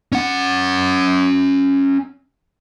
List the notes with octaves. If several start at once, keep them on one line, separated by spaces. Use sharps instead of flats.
C#4 F#5